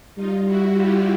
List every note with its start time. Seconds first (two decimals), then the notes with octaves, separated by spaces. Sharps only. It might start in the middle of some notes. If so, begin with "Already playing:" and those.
0.16 G3 D#4 F4
0.45 E4 F#4
0.74 F4 G4